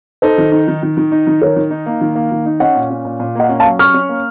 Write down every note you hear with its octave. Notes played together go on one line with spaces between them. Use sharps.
D#4 A4 C5
D#3
D#4
D#3
D#3
D#3
D#4
D#3
D#3 A#4 C#5
D#3
D#4
A#3
D#3
A#3
D#3
D#4
C#4 D#5 F#5
A#2
C#4
A#2
A#2
A#3 D#5 F#5
C#4
F5 A5
F#3
C#4 C#6 F6
C#4
A#3